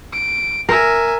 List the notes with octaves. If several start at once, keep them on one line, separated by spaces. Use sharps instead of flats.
D7
A#4 E5 G#5